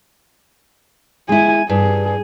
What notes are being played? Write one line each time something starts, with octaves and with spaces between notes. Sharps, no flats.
G#3 E4 G#5
G2 G#4